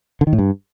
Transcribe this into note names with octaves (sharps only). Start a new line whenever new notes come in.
D3
D#3
A2
G2